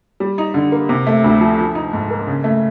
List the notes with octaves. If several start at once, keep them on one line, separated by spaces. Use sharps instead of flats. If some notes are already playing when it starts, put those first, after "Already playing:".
G3
D#4
D3
A#3
C3
A3
D2
F3
F3
D#4
G#2
A#3
C#3
A3